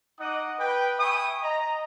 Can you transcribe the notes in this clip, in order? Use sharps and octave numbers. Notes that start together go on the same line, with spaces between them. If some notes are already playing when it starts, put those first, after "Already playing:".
D#4 D#5 F#5 D6 D#6
B4 G5
E5 G5 G#5 B5 C#6 D#6
D#5 A#5